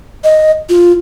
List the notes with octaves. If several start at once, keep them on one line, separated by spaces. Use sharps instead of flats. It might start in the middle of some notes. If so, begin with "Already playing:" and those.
D#5
F4